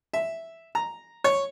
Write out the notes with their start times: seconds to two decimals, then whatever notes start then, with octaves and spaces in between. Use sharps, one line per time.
0.13 E5
0.75 A#5
1.24 C#5